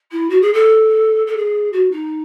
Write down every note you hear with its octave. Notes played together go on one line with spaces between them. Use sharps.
E4
F#4
G#4
A4
A4
G#4
F#4
D#4